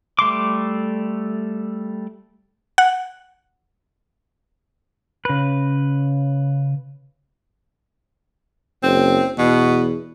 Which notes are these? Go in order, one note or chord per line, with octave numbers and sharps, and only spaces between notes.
G3 A3 C6 D6
F#5
C#3 B4
F#1 C4
E2 B2